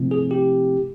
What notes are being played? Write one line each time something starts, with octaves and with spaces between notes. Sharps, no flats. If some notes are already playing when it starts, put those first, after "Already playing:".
Already playing: C3 F3 A3 C4 E4
G#4
G4